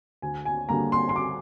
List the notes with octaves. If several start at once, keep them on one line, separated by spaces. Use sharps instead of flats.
D2 G#5
G#5
D3 G3 A#3 A#5
C6
C6
D6